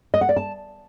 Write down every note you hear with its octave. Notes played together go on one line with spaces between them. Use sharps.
D#5
F#5
D5
A5